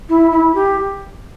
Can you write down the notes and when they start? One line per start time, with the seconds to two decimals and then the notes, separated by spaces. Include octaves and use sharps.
0.09 E4
0.32 E4
0.55 G4